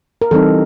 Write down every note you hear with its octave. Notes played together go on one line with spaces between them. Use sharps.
A#4
E3 G3 C4 D#4 A4